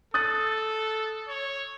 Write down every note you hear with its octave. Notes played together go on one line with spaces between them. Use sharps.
A4 D#6 F#6 A6
C#5